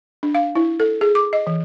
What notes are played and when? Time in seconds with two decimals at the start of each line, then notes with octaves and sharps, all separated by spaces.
0.23 D4
0.35 F5
0.55 E4
0.80 A4
1.01 G#4
1.15 D6
1.33 D#5
1.47 E3